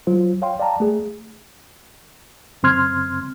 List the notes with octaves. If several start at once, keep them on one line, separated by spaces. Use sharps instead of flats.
F#3 F4 C5
C#5 F5 G5 C6
D5 F5 G5 A5 A#5
A3 G#4
F#2 C#3 C4 C6 F6 G#6